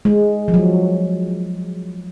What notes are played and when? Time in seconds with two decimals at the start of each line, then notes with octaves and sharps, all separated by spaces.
0.05 G#3
0.48 F3
0.54 F#3